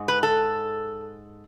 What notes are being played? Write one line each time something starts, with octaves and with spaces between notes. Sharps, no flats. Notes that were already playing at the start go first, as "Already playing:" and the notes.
Already playing: G#2 G#3
B4
A4